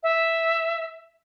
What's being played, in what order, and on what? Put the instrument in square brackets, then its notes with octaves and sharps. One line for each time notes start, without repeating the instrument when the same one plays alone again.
[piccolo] E5